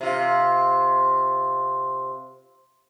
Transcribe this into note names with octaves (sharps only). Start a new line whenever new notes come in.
C3 F4